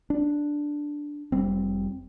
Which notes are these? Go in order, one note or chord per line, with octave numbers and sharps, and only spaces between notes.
D4
F1 G3 C4